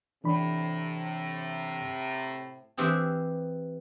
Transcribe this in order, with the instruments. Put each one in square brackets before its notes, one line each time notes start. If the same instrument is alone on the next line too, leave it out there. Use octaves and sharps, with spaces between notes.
[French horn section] A2 C3 [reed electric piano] E3 D4 B5
[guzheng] E3 C4 E4 G4 G#4